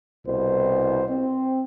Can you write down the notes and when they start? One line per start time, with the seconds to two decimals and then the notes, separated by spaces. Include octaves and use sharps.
0.27 C2 B2 C5
1.08 C4